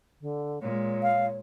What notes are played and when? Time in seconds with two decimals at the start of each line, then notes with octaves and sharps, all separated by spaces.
0.21 D3
0.62 A#2 G#3 C#5
1.03 F5